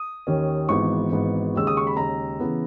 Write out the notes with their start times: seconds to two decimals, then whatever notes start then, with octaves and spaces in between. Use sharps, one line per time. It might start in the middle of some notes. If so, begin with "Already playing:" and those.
Already playing: D#6
0.27 D#2 D#3 A#3 C#4
0.69 G#1 G#2 E3 B3 C#6
1.12 G#1 G#2 E3 B3
1.55 D#2 C#3 G#3 E6
1.67 D#6
1.77 C#6
1.87 B5
1.97 D#2 C#3 G#3 A#5
2.40 C#3 E3 B3